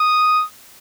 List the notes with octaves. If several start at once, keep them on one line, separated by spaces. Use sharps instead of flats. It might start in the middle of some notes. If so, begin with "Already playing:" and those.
Already playing: D#6